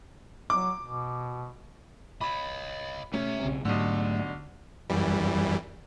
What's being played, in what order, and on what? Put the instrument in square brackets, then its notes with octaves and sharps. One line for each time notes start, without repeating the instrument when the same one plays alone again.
[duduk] F#3 [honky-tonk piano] D6
[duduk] B2
[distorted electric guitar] C#5 D#5 [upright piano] B5
[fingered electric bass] A3 [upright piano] C#4 [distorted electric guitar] G4 E5
[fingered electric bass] B1 C#3 C4
[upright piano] B1 D3 [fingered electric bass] G#2 F#3 [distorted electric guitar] A3
[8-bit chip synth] F#2 E3 G3